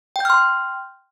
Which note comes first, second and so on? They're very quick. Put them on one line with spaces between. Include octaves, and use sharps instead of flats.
G5 G6 F6 C6